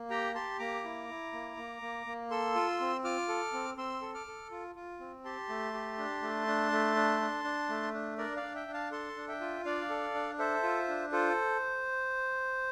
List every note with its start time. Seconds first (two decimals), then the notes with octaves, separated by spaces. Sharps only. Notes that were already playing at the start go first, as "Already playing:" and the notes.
Already playing: A#3
0.10 G4 G5 A#5
0.34 G4 A5 C6
0.59 A#3 A#5 D6
0.84 E4
1.09 E4
1.33 A#3
1.57 A#3
1.82 A#3
2.06 A#3
2.30 A4 C6 E6
2.55 F4
2.80 C4
3.04 F4 D6 F6
3.28 A4
3.53 C4
3.77 C4 C6 E6
4.02 A4
4.14 D6 F6
4.27 A4
4.51 F4
4.75 F4
5.00 C4
5.24 G4 A5 C6
5.49 A3
5.73 G4
5.98 D4
6.22 A3
6.47 D4
6.72 A3
6.96 D4
7.21 D4
7.44 D4
7.69 A3
7.94 D4
8.18 D4 A#4 D5
8.37 D5 F5
8.42 D4
8.55 E5 G5
8.68 D4
8.73 F5 A5
8.92 A4 A5 C6
9.16 D4
9.28 E5 G5
9.41 F4
9.65 D4 D5 F5
9.90 A4
10.15 D4
10.39 A4 C5 E5
10.63 F4
10.88 D4
11.12 F4 A4 C5